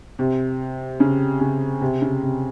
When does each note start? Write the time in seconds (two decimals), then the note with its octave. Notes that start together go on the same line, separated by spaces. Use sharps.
0.19 C3
1.00 C#3
1.41 C#3
1.81 C3
2.02 C#3
2.22 C3